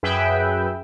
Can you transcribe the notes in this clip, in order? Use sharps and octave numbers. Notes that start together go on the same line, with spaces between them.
F#2 G#4 B4 E5 G5